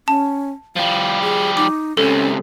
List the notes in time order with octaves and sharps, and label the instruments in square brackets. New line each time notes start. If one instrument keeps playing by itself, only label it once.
[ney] C#4 [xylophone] A5
[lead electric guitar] F3 G3 [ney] F5
[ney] G#4
[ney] D#4 [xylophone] D6
[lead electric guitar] C#2 C3 [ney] C#4 [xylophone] A4